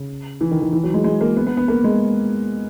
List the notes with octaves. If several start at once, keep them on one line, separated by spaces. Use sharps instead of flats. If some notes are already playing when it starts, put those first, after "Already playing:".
Already playing: C#3
E3
D#3
D#3
E3
F#3
G#3
G#3
A#3
B3
B3
B3
A#3
G#3